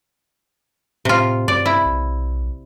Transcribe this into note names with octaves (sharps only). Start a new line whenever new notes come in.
A2 C3 F4
G2 D5
E4
B1